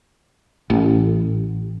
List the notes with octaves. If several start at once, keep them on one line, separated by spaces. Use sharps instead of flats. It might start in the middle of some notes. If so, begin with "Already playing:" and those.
A1